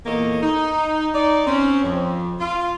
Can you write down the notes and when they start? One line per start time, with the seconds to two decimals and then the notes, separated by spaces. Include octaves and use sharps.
0.06 E2 A#2 A#3 A4 C#5 D#5
0.42 D#4
1.14 D#4 D5
1.47 C4 C#4
1.83 F2
2.40 F4